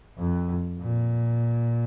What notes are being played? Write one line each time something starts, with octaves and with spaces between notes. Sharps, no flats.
F2
A#2